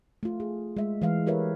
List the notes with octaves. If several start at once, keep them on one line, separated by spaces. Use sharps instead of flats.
A3 F4
G#4
G#3 E5
E3 G#3 E5 F5
E4 G4 A#4 B4 C#5 E5